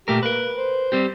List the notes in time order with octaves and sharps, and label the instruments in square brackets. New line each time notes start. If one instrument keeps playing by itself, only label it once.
[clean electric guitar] A#2 A3 A#4 [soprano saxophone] G4
[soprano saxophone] A#3 [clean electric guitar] A#4 B4
[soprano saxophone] C5
[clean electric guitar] G3 C4 G4